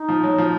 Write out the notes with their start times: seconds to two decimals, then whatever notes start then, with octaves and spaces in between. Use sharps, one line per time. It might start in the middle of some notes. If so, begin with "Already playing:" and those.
Already playing: D#4
0.09 F3
0.24 F#3
0.38 F3